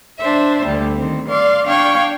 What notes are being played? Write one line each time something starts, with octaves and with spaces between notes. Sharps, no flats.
D4 C5 E5
D2 G3
D#3 C4
D5 F5 C6
D4 F5 G5 C#6 G#6